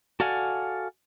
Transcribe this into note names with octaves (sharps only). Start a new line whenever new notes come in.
F#4 A4 D5 F5 F#5 G#5